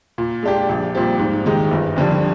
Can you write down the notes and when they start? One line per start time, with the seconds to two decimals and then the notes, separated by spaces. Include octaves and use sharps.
0.18 A#2
0.43 G#3 D4 G4
0.69 A#1
0.95 A#2 G3 C4 G4
1.19 G#2
1.46 D#3 G#3 D#4 G4
1.71 G1
1.97 F2 D3 G3 D4